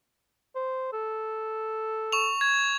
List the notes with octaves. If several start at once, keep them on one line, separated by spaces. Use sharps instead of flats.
C5
A4
C#6 F7
G#6